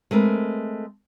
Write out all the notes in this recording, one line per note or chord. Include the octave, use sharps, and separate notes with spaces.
G#3 A3 C4 A#4 B4